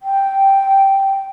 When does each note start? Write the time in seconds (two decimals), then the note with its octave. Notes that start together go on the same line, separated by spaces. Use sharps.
0.01 G5